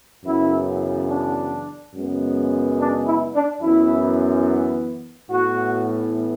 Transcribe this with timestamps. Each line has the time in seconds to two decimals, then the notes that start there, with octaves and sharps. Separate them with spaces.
0.25 F#2 C#3 E3 B3 E4
1.09 D4
1.93 F#2 C#3 G#3 B3
2.78 D4
3.06 E4
3.34 D4
3.62 F#2 E3 B3 E4
5.30 A2 E3 B3 F#4